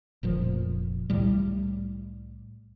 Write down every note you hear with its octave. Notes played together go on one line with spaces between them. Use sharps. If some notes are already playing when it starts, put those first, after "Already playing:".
F1 A#2 F3
C2 A2 G3